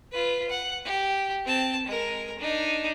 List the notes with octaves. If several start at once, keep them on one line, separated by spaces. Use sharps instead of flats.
F4 B4
F#5
G4
C4 A5
G#3 A#4
D4 D#4